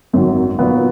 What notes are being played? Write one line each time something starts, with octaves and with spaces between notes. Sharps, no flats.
G#1 F#2 D#3 F#3
A#2 F#3 B3 F4